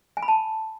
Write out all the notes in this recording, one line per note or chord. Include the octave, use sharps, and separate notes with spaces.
G#5
B5
A5